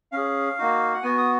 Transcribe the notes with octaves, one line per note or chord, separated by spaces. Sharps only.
C#4 G#4 F5
A#3 D#4 F#4
F#5
B3 F#4 G#5
D#6